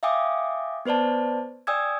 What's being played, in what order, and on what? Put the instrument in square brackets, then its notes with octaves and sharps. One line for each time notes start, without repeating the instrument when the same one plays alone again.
[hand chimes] E5 F5 G5 G#5 D6 D#6
B3 B4 C5 D5 A5
D5 G5 G#5 D#6 E6 G#6